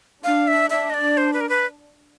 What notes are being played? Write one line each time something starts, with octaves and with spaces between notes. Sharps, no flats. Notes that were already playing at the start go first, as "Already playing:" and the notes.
D4 F5
E5
D4 E5
D#5
D5
C5
B4
A#4
B4